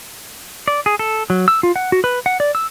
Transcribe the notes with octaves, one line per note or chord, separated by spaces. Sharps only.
D5
G#4
A4
F#3
E6
F4
F#5
F#4
B4
F#5
D5
E6